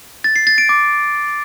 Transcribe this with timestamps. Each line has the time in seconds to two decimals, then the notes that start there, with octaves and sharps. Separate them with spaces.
0.24 A6
0.36 C7
0.47 A6
0.58 D7
0.69 D6